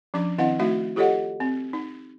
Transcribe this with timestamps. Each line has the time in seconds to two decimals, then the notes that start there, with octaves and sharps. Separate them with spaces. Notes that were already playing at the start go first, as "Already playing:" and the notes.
0.14 F3 C#4 D4 D6
0.38 D#3 C4 E4 D#5 F5 F#5
0.60 A3 D#4 F#4 E5 F5
0.96 F4 G4 A4 C#5 D#5 F#5
1.40 C4
1.73 D#4